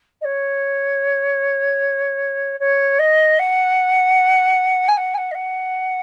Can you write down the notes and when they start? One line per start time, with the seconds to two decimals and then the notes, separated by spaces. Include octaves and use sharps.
0.21 D#5
0.24 C#5
2.60 C#5
2.99 D#5
3.39 F#5
4.88 G#5
4.97 F#5
5.14 G#5
5.17 F#5
5.31 D#5
5.34 F#5